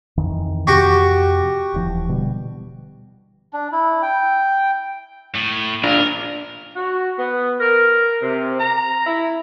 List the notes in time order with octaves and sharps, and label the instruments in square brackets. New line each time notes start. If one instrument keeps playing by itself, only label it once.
[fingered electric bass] F2 D#3 E3
[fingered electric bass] F2 C3 [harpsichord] F#4 G4 C#6
[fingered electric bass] D#1 E3 F3
B2 D3 G3
[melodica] D4
E4
G5
[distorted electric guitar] A2
[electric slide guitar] D4 F4 [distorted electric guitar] A#4
[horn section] F#4
B3
A#4
C3
A#5
E4